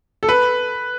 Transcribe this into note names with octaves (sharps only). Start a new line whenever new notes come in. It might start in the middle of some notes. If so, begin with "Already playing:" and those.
A4
B4